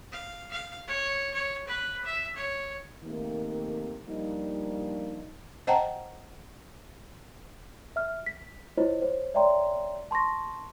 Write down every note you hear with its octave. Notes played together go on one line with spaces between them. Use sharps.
F5
F5
C#5
C#5
B4
E5
C#5
C3 D#3 A3 A#3
F3 G3 A#3 D4 D#4
C5 D#5 F#5 G5 A5 A#5
E5 F6
B6
E4 F4 C5 C#5 D#5
C5 C#5
C#5 D5 E5 G5 A#5 C6
A5 C6 C#6 A#6